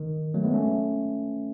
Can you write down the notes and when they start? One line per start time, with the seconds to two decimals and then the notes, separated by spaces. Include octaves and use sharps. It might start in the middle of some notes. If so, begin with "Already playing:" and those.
Already playing: D#3
0.34 F#3 A3
0.44 G#3 B3
0.54 A3 C#4